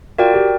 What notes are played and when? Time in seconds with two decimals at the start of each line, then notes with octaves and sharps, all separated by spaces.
0.18 F4 F#4 A#4 D5 G5
0.34 G4